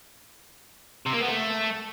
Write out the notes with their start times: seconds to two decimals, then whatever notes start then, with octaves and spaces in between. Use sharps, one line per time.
1.06 C3
1.14 A#3
1.21 B3
1.28 A3